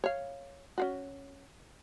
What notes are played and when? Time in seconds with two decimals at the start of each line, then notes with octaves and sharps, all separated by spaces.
0.04 C#5 F5
0.78 C#4 F4 F#4